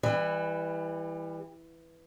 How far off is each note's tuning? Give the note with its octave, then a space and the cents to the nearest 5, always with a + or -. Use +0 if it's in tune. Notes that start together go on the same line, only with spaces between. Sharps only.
E3 +0 G3 +30